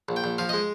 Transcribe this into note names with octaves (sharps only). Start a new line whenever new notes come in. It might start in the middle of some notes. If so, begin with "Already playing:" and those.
A#1
G5
A#1
F3 F5
G#3 D#5